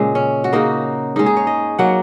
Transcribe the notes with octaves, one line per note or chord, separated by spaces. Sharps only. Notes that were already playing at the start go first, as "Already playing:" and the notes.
Already playing: A#2 C#3 G#3
C#4
F#4
C#3 A#3 D#4
G#2 G#3 D#4
G#4
C#5
D#5
F#3 A#3 F#5